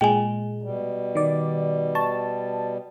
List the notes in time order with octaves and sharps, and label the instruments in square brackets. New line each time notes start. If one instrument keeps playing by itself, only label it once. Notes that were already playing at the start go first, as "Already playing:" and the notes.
[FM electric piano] A#2 G#3 [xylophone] G5 G#5
[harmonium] B2 G3
[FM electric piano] D#3 D5
[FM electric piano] A5 [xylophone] C#6